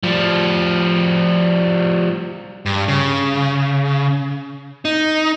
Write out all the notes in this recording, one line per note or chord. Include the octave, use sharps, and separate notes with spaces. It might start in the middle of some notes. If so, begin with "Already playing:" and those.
F3 G3
G2
C#3
D#4